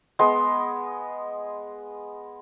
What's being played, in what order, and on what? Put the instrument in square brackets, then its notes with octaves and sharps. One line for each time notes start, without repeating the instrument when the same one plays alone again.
[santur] G#3 B3 C6